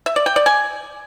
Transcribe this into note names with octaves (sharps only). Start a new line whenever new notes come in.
E5
D5
G5
D5
G#5